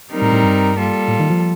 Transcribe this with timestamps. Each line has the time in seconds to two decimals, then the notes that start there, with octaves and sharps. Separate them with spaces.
0.11 G3 C4 D#4 A#4
0.22 A2
0.33 A2
0.43 G2
0.76 G3 A#3 F4 A4
1.08 A2
1.20 D#3
1.30 F3